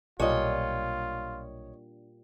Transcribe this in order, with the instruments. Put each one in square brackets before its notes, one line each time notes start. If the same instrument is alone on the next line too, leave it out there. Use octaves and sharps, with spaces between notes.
[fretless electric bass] B1 [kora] A#2 G3 D4 [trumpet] F4 [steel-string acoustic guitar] C#5 D#5